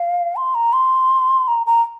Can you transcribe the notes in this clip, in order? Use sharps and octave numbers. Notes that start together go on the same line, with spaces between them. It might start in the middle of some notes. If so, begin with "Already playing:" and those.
Already playing: F5
C6
A#5
C6
A#5
A#5